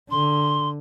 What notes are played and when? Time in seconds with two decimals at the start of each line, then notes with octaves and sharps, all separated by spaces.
0.11 D3 C6